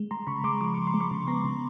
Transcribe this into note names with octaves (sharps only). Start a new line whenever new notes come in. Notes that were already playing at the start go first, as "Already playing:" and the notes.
Already playing: G#3
G#3 A#5 C6
C#3 B5 C#6
G#3 C6 D6
F3 D6
F3 C#6
C6
G#3
B5 C#6
C#3
B3 A#5 C6
C#3